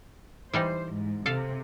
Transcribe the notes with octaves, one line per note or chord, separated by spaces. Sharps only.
E3 G3 D#4 C5
G#2
C3 A4 F5